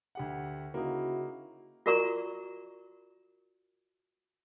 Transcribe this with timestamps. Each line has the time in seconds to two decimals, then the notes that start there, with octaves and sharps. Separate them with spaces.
0.15 D2 G4 F#5
0.74 C#3 A#3 D#4 E4 F#4
1.86 F4 F#4 A#4 D5 A#5 C#6